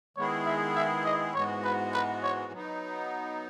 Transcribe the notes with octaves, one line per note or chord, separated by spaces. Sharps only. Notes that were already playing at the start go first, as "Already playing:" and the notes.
D#3 G#3 B3 E4 G#4 C#5
E5
E5
D#5
G#2 E3 G#3 B3 F#4 C#5
B4
B4
C#5
F#3 B3 D#4